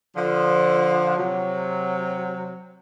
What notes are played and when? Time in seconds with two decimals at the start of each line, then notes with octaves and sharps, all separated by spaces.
0.15 D3 F3
1.17 C3 F#3